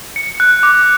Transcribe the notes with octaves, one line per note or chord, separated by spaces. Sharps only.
C#7
F#6
D6